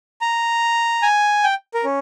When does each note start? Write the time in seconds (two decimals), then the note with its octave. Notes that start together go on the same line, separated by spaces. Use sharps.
0.21 A#5
1.02 G#5
1.44 G5
1.74 A#4
1.84 C#4